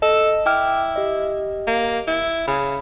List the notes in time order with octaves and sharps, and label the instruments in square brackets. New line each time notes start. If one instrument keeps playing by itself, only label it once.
[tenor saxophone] A4 [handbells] D#5
[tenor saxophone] E4 [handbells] G5 D6 F6
[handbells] G4 D#5
[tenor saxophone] A#3
E4
[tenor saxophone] C#3 [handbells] B5